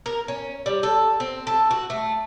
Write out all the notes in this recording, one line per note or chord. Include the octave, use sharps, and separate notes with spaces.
A#4
C#4
G3
A4
C4
A4
F#4
A3